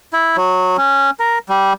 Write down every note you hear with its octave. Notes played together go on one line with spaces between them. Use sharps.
E4
F#3
C#4
A#4
G3